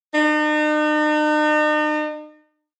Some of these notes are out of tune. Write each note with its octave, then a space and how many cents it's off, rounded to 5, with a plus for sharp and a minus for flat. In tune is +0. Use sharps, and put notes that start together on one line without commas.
D#4 -45